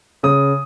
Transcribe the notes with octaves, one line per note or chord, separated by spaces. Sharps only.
C#3 D#6